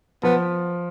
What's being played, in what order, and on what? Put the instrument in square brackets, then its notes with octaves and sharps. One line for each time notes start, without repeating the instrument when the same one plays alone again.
[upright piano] F3 [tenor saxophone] B3